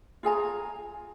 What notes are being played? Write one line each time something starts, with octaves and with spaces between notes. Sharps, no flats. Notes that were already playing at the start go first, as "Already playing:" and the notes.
F4 G#4 G#5 A#5